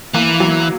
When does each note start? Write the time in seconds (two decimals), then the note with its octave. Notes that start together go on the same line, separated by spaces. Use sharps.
0.14 E3 A#3
0.40 F#3